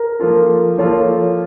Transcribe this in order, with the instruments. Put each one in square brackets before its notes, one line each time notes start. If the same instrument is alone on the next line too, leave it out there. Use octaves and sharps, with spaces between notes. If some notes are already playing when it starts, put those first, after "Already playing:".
Already playing: [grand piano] A#4
[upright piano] F3 A#3 F4 A4
[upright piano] F3 A#3 F4 A4 [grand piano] C#5